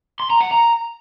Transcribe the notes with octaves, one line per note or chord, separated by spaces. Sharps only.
C6
A#5
F#5
A#5